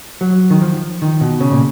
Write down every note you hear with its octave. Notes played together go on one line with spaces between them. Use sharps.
F#3
D#3
F3
D#3
B2
C#3
A#2